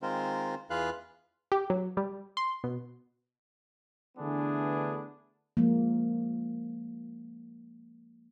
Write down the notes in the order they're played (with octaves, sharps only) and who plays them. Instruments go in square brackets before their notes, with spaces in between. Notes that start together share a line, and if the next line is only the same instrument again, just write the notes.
[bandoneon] D#3 G#3 C4 F4 A#4 C5
E2 F4 G#4 B4 F5 F#6
[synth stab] G4
F#3
G3
C6
B2
[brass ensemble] D3 E3 A3 B3 D4 G#4
[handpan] F3 G#3 A#3